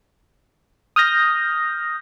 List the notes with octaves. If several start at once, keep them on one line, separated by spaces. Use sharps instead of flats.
D#6 F6 G6 A#6